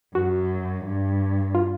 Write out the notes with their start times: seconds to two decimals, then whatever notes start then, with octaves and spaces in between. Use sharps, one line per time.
0.15 F#2 F#4
0.85 G2
1.55 F4